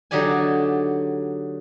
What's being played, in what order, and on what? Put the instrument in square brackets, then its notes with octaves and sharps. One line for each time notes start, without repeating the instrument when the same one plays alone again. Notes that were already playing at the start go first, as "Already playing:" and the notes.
[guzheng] D3 F#3 D#4 G4 D5 G#5